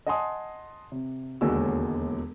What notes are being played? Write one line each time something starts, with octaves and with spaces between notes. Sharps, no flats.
D#5 F#5 G#5 A5 C6 D#6
C3
E1 D#2 D3 G#3 F#4 E6